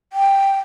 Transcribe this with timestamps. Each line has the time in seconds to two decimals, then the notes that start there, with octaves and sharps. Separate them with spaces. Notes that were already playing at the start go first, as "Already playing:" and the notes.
0.13 G5